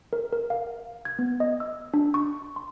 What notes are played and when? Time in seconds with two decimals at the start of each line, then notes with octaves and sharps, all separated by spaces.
0.13 A#4
0.33 A#4
0.50 F5
1.05 G#6
1.19 B3
1.40 D#5
1.60 E6
1.94 D4
2.14 C#6
2.56 C6